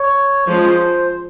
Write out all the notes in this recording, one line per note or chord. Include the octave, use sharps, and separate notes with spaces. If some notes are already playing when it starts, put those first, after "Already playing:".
Already playing: C#5
F3 G#3 C#4 C5